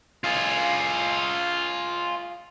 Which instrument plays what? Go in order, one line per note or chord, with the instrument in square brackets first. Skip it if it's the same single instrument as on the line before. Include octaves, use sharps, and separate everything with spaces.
[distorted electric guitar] F4 G#4